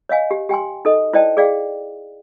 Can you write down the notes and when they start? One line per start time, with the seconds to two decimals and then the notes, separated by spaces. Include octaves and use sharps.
0.09 C#5 D#5 F5 G#5
0.31 G4
0.49 G4 G5 G#5 C6
0.85 D#4 A4 D#5
1.13 E4 C5 D5 D#5 G5 A5
1.37 G#4 D5 F5 G5